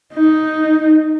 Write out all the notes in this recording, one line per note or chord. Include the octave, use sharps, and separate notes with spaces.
D#4